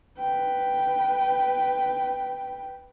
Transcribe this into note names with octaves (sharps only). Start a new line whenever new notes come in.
B4 G5